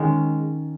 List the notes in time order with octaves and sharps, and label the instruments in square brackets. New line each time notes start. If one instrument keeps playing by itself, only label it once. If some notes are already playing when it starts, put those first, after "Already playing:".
Already playing: [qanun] D#3 G#3 C#4